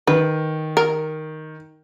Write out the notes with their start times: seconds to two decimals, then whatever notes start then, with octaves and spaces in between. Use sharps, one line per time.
0.07 D#3 B4
0.77 A#4